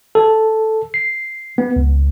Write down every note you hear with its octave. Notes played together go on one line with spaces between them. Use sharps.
A4
C7
B3
C#2